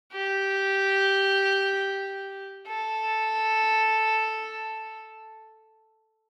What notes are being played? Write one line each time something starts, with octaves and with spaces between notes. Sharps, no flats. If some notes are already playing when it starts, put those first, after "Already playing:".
G4
A4